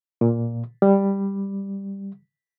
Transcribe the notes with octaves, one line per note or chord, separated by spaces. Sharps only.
A#2
G3